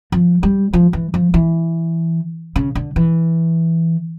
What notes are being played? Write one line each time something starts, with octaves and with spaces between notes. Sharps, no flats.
F3
G3
F3
E3
F3
E3
C#3
D3
E3